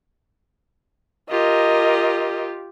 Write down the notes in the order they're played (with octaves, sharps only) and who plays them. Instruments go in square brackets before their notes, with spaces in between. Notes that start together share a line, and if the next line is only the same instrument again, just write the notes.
[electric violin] F4 G4 [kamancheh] A#4 D#5